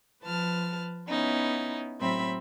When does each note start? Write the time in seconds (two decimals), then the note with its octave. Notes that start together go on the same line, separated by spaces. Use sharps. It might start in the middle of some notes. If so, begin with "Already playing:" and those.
0.23 F3 B4 A5 F6
1.08 B3 C#4 D#4 E4
1.99 A2 F#3 C4 E5 B5